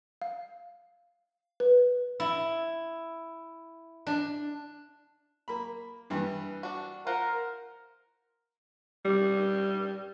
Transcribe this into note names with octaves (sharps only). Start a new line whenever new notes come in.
F5
B4
E4
D4
A#3 B5
G2 E3 G3
D4 F#4
F4 A#4 C5 F#5
G3